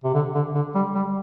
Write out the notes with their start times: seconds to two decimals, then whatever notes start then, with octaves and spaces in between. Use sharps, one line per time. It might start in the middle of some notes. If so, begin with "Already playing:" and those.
0.04 C3
0.14 D3
0.35 D3
0.55 D3
0.75 G3
0.95 G3